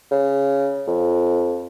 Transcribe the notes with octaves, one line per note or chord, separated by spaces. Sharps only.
C#3
F2